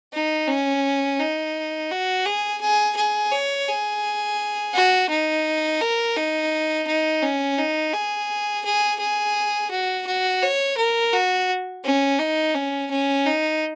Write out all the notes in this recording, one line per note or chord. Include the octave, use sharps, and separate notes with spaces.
D#4
C#4
D#4
F#4
G#4
G#4
G#4
C#5
G#4
F#4
D#4
A#4
D#4
D#4
C#4
D#4
G#4
G#4
G#4
F#4
F#4
C#5
A#4
F#4
C#4
D#4
C#4
C#4
D#4